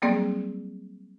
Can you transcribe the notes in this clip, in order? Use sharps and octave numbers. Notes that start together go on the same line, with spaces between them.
F#3 G3 A#3 C4 G#4 D5